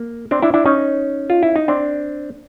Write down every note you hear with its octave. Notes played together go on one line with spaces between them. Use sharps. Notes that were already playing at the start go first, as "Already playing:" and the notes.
Already playing: A#3
C4 D4
D4 E4
D4 E4
C#4 D#4
F4
E4
D#4
C4 D4